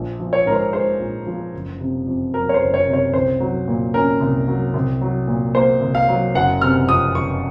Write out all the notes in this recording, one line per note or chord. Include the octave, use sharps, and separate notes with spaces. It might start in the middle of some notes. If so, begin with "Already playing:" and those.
Already playing: A#1
F3
C#5
G#2 A#4
C5
G#3 C5
A#1
F3
F#1
C3
F2
F#3 A#4
C#5
C5
F#1
C#5
C3
C#5
C2 C5
F#3
A#2
C#4 A#4
C2
F#3
C2
F#3
A#2
A#3 C5
C2
F5
F#3
F#1 F#5
C3 F6
F2 D#6
F#1 C#6